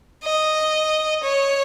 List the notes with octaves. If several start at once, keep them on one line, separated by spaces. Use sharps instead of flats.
D#5
C#5